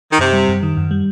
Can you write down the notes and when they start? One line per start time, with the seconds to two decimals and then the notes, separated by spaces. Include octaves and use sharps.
0.11 D#3
0.19 F#2 C3
0.33 G3
0.48 F#2
0.63 D#3
0.77 F#2
0.91 G3